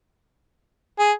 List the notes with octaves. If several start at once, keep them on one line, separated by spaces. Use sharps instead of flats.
G#4